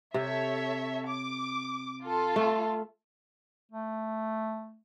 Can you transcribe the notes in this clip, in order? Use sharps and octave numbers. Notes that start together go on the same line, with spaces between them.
C3 A4 C#5 E5
D6
F4 A4
A3
A3